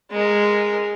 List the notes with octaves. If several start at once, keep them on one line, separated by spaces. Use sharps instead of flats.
G#3 A#4